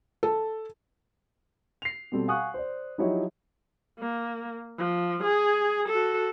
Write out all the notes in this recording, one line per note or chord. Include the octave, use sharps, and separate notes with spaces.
A4
C7 F7
B2 G3 C4 A4
F5 F#5 G#5 C#6 D#6 F#6
C5 D5
F3 F#3 D#4 E4 G4 C#5
A#3
F3
G#4
F#4 A4